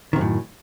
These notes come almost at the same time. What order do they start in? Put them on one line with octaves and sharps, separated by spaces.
D#3 C3 F#2 A2